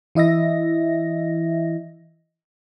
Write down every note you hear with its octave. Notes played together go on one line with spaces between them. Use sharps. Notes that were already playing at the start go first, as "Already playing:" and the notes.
E3 E4 D#5 E5 A#6